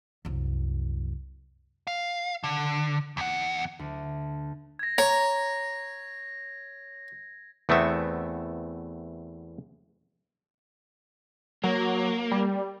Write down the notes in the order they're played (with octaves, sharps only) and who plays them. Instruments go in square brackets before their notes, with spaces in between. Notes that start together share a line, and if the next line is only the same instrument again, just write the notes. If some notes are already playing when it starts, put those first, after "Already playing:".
[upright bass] C2 F#2
[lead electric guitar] F5
D3
E2 F#5
[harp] D2
[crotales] G#6 A#6
[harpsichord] C#5 [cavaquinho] A#5
[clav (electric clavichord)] E2 A3 B3 C4 E5
[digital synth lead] F#3 [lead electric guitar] A#3
[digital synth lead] G3